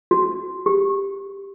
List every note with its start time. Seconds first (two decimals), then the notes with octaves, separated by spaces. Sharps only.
0.11 F#4
0.66 G4